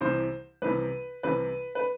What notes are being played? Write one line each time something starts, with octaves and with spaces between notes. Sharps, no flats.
C2 C3 E3 C5
C2 C3 E3 B4
C2 C3 E3 B4
B4